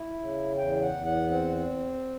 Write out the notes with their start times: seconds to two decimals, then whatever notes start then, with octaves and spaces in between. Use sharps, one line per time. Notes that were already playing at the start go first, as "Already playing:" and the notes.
Already playing: E4
0.20 C#3
0.57 E2 G5
0.82 F#5
0.93 E2
1.06 F#5
1.30 C4 F#5